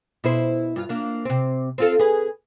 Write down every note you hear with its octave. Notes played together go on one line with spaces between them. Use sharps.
B2 E4 C5
G2 F4
A#3 D4
C3 C4
C4 F4 A4
G#4 B4